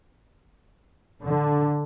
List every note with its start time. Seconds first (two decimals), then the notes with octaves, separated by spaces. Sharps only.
1.23 D3